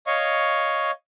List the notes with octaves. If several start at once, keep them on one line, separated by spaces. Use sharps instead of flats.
C#5 D#5 F5 C#6